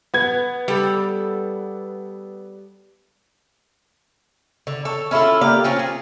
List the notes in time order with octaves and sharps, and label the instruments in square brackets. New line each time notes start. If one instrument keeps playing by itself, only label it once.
[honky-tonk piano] B3 G#6
[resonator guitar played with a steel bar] G3 A4
[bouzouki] D3
A4 C#5
C#4 E4 F4 A4
A#3 G4 D5 F5
C4 C#4 F4
G#4